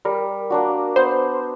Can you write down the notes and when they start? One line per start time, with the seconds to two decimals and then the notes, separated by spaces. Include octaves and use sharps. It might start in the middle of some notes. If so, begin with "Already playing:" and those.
0.05 G3 A#4
0.50 A#3 D4 F#4
0.96 B3 C5